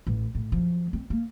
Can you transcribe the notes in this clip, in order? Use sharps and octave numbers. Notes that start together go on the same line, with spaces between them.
A1 A2
A2
F#2 F3
C4
A#3